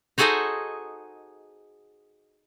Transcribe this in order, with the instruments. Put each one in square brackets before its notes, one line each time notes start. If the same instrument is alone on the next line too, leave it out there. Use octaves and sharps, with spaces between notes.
[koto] D#4 F#4 G#4 A4 C5 D#5